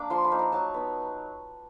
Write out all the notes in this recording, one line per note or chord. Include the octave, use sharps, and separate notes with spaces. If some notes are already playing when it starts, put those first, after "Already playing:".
Already playing: A#3 D4 D6
F3 C6
B5
A#3 D#4
A#5
F#3 A5
B3 D#4